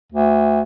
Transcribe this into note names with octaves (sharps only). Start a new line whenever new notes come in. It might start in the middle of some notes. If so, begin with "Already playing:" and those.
D2